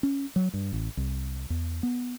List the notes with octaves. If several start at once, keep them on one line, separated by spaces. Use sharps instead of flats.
C#4
F#3
G2
A1
C2
E2
B3